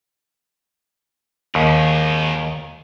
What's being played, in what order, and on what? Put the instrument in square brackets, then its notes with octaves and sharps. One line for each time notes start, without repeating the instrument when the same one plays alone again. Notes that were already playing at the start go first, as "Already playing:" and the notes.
[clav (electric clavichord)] D#2 [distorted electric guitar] D#3 G#4